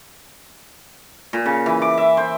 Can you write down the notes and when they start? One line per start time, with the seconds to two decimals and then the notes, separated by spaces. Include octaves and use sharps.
1.33 A#2
1.46 C#3
1.66 E3
1.82 D6
1.98 E5
2.17 C5